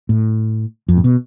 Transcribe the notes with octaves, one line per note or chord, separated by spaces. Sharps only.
A2
F2
A2
B2